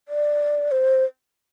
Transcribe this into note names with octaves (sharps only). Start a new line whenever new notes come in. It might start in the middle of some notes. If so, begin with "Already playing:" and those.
D5
C5